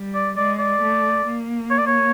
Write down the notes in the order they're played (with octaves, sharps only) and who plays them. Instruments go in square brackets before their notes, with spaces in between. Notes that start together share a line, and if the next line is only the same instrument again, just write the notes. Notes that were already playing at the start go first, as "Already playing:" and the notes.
Already playing: [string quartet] G3
[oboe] D5
[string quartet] G#3 [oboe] D5
[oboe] D5
[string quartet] A3
A#3
[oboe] C#5
D5
C#5